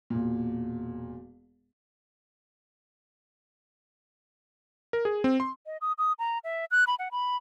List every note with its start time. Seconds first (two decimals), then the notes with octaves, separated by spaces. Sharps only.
0.10 E1 A#2
4.93 A#4
5.05 G#4
5.24 C4
5.40 C6
5.66 D#5
5.81 D#6
5.98 D#6
6.19 A#5
6.44 E5
6.71 F#6
6.87 B5
6.99 F#5
7.12 B5